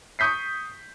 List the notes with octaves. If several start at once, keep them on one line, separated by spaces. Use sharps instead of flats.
C#6 D#6 G6 B6 C7